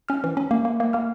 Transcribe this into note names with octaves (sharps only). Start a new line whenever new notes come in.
C#4 F6
E3
C#4
A#3
A#3
A#3
A#3 F6